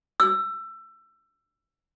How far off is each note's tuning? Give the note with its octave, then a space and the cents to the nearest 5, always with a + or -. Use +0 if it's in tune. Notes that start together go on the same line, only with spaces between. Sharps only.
E6 +20